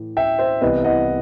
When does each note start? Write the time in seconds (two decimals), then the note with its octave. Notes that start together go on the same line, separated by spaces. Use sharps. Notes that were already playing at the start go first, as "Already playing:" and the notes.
Already playing: A2 E3
0.17 E5 G5
0.39 C5 E5
0.61 C2 C3 E3 B3 B4 D#5
0.84 D#5 F#5